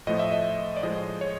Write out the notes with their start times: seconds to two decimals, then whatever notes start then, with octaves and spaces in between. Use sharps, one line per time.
0.07 A2 F3 A3 D#5
0.19 E5
0.32 D#5
0.76 D5
0.83 A2 F3 G#3 D#5
1.21 C#5